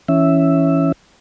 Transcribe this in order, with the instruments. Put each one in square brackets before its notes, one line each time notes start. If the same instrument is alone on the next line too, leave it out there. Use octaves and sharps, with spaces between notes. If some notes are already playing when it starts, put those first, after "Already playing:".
[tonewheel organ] E3 C#4 E5